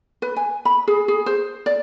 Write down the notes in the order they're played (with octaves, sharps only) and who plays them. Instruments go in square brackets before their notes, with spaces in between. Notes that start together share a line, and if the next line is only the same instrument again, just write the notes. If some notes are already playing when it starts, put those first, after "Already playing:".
[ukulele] B4
G#5
B5
G#4
G#4
C5
D5